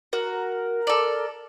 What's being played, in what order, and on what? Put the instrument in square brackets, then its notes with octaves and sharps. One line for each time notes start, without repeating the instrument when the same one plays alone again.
[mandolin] F#4 [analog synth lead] A#4
[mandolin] A4 D5